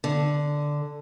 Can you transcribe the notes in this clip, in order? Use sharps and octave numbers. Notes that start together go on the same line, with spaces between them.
D3